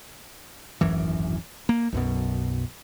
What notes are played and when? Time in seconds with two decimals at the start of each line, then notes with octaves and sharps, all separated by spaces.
0.81 D1 G#1 F#2 E3
1.69 A#3
1.92 B1 F#2 B2